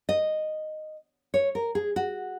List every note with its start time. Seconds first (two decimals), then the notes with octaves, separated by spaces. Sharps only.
0.09 D#5
1.34 C#5
1.55 A#4
1.75 G#4
1.96 F#4